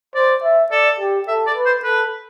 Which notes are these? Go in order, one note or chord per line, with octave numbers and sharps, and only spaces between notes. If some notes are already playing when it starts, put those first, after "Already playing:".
C5 D5
E5
A4 D5
G4
A4 E5
D5
B4
C5
A4 B4